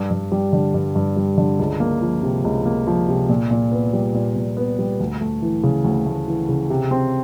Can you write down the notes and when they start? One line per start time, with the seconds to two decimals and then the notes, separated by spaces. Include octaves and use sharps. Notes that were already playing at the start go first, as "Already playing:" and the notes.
Already playing: G2
0.11 G2
0.32 G3
0.53 D3
0.74 G2
0.96 G2
1.17 G3
1.38 D3
1.59 C#2
1.80 A#3
2.02 F3
2.23 C3
2.45 C#2
2.65 A#3
2.87 F3
3.09 C3
3.29 A#2
3.51 A#2
3.72 B3
3.93 G3
4.14 A#2
4.36 A#2
4.57 B3
4.79 G3
5.00 D2
5.21 A3
5.42 E3
5.63 C#3
5.84 D2
6.06 A3
6.27 E3
6.49 C#3
6.70 C3
6.91 C4